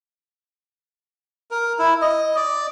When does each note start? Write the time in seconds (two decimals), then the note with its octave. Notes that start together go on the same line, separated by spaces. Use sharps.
1.51 A#4
1.79 E4
2.01 D#5
2.36 D5